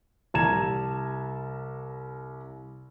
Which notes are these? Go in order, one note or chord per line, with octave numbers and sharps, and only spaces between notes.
C2 A5 A#5 G#6 E7